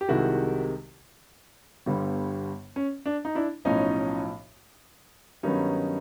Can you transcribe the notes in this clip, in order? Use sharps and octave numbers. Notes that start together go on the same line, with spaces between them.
G4
C2 C3 D#3 G#3 E4 F#4
G1 G2 D3 G3 B3
C#4
D4
D#4
D4 E4
B1 A2 F3 C#4 D#4
G2 D#3 F#3 B3 C#4 D#4